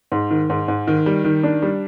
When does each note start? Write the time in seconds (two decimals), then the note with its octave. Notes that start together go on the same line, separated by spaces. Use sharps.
0.12 G#2
0.31 D#3
0.50 G#2
0.68 G#2
0.87 D#3
1.06 G3
1.25 D#3
1.43 D4
1.62 G3